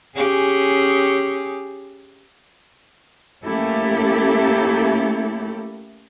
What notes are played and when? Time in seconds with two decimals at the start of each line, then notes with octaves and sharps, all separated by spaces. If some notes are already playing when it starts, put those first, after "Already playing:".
0.16 C#4 G4 G#4
3.43 A3 A#3 C#4 E4 G4 A4